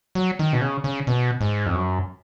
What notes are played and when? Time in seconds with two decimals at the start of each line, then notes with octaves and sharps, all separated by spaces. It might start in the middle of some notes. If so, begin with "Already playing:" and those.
0.15 F#3
0.39 D#3
0.53 B2
0.61 C#3
0.84 C#3
1.07 B2
1.41 G#2
1.66 F2
1.75 F#2